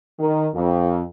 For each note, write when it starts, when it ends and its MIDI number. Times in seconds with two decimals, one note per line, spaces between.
0.19 0.47 51
0.54 1.02 41